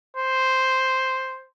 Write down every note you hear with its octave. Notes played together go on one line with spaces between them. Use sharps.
C5